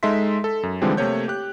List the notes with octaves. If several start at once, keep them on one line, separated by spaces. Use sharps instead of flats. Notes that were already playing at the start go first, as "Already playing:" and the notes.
G#3 D#4 A4 E5 C6 B6
A4
F#2
D3 E3 F3 G3 G#3 C4
C3 A3 A#3 C#5 G6
G4 F#6